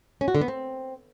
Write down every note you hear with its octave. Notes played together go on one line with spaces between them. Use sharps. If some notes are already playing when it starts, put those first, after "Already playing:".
C#4
F#4
D3
B3
C4